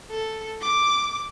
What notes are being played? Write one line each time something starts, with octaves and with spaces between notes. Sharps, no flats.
A4
D6